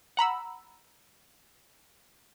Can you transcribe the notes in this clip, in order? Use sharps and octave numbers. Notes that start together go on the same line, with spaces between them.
F#5 A#5 B5 E6